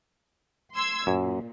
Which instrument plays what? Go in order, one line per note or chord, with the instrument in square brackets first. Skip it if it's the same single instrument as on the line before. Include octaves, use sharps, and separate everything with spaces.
[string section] C6 E6 G#6
[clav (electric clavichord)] F#2 [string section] A#2